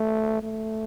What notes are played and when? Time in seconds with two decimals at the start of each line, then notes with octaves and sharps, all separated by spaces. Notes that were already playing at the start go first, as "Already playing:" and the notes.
Already playing: A3
0.43 A3